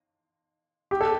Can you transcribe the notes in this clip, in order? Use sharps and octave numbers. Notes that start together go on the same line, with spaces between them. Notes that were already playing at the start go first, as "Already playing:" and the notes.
G4
A4